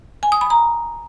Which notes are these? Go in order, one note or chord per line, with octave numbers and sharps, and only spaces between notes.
G#5
D#6
B5
A#5